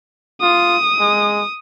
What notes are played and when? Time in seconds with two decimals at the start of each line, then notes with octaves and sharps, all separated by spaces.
0.42 F4 D#6
1.00 G#3